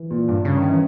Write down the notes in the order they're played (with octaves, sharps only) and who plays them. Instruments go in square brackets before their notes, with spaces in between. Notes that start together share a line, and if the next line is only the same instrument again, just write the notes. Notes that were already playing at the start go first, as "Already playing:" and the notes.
Already playing: [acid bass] E3
[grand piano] A#2
G2
[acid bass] C#3 [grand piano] C#4
[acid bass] D#3
[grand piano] C#4
[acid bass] E3